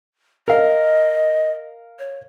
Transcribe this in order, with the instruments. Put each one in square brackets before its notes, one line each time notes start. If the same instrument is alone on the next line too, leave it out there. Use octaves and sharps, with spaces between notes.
[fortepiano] A#4 F5 [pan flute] D#5
[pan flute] C#5